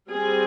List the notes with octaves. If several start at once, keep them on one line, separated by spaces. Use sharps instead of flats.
G3 C4 G#4